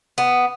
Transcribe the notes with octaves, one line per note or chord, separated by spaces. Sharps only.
B3